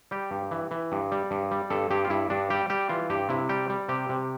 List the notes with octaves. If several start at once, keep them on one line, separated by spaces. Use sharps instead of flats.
G3 G4
G2
E3
E3
G2
G3
G2
G3
G2 A4
G2 G4
F4
G2 E4
G2 D4
G3 G4
G3 G4
E3 F4
G2 G4
C3 E4
G3 G4
G3
C3 G4
C3